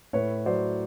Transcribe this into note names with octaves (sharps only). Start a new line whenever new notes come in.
A2 B4 C#5
F#3 C5 D5